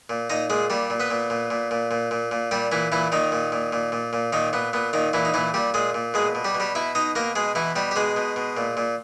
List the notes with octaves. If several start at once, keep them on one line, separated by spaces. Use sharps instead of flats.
A#2
A#2 D#4 D#5
A#2 G#3 G#4
A#2 G3 G4
A#2
B3 B4
A#2
A#2
A#2
A#2
A#2
A#2
A#2
A#2 G3 G4
A#2 E3 E4
A#2 E3 E4
A#2 D#3 D#4
A#2
A#2
A#2
A#2
A#2
A#2 D#3 D#4
A#2 B3
A#2 B3
A#2 D#3 D#4
A#2 E3 E4
D#4
A#2 E3 E4
A#2 G3 G4
A#2 G#3 G#4
A#2
B2 G#3 G#4
B2
G3 G4
B2
G3 G4
B2 E4 E5
B2 D#4 D#5
B2 A#3 A#4
B2 G#3 G#4
B2 E3 E4
B2 G3 G4
G4
B2 G#3 G#4
B2
B2
A#2
A#2